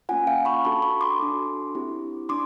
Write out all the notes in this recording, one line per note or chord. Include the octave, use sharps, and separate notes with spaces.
A#3 C#4 F4 F#5 G#5
F5 G5
B5 C#6
D4 F#4 A4 A5 B5
B5 C#6
C6 D6
D4 F#4 A4
C4 E4 G4
D4 C6 D6